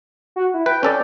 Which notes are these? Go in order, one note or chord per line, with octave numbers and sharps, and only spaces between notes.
F#4
E4
B4 G5
C#4 A4 D5